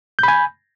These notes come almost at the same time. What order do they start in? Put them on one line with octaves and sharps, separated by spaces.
G6 B5 G#5